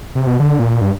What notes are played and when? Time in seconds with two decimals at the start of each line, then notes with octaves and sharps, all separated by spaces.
0.15 C3
0.27 B2
0.40 D3
0.59 A#2
0.81 G2